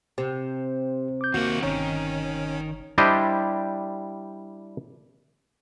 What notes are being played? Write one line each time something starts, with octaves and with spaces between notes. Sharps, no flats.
C3 G4 C5
D6 G6
D#2 A#3 F#4 F#5
G1 D#3 C#4 C#5 A#5
G3 D4 E4 G4 C5 D#5